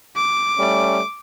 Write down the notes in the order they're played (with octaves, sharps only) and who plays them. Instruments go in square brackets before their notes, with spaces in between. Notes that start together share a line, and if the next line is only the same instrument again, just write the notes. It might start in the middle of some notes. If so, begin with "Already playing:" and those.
[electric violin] D6
[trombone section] G3 A3 C#4